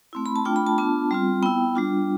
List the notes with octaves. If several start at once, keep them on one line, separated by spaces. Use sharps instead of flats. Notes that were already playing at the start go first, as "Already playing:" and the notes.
A3 C4 E4
B5
A5
A3 D4 F4 G5
B5
A5
B3 D4 F4 A5
G3 C4 F4
B3 E4 G5
G3 D4 F4